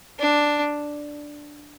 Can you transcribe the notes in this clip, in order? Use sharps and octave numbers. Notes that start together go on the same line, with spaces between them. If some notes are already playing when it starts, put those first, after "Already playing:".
D4